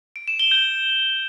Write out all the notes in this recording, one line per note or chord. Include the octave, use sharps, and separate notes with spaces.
D7
E7
G7
G6